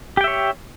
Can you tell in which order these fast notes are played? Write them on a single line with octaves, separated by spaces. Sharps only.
G4 G5 E5 C#5